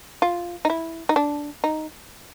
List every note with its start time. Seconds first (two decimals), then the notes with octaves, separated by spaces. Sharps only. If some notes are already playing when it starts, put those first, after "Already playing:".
0.22 F4
0.65 D#4
0.70 E4
1.09 D#4
1.16 D4
1.64 D#4